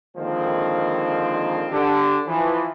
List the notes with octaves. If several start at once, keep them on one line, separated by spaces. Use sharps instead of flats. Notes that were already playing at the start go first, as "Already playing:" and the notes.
D3 D#3 F3 G#3 A#3 C4
D3 D4 G4
E3 F3